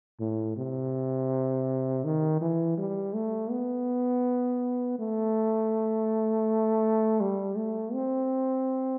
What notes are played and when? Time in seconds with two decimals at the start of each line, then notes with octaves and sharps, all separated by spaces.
0.20 A2
0.57 C3
2.04 D#3
2.41 E3
2.78 G3
3.14 A3
3.51 B3
4.99 A3
7.20 G3
7.57 A3
7.93 C4